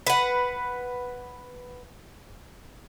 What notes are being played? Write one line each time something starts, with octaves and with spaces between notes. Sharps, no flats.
B4 F#5